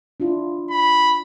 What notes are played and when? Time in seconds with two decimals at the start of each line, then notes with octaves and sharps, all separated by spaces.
0.20 D4 E4 F4
0.71 B5